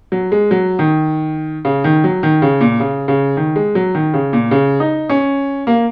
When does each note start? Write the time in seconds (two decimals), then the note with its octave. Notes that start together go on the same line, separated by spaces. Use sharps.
0.12 F#3
0.32 G#3
0.51 F#3
0.79 D#3
1.65 C#3
1.84 D#3
2.04 F#3
2.23 D#3
2.42 C#3
2.61 A#2
2.80 C#3
3.08 C#3
3.37 D#3
3.56 G#3
3.75 F#3
3.95 D#3
4.14 C#3
4.33 A#2
4.51 C#3
4.80 D#4
5.09 C#4
5.67 A#3